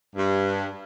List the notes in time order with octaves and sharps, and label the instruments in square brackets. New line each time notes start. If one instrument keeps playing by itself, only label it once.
[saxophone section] G2